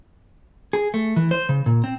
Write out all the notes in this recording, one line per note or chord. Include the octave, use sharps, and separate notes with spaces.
G#4
A3
E3
C5
C#3
A#2
C4